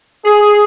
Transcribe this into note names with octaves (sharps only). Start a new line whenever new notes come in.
G#4